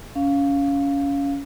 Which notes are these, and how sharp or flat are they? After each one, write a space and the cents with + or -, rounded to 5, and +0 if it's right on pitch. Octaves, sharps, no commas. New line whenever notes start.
C#4 +20 F5 +0